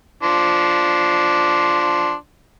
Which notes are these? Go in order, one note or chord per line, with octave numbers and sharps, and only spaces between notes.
F3 D4 C6